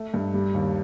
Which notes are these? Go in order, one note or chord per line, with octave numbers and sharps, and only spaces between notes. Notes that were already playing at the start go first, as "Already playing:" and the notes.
Already playing: A3
G2
G3
D#2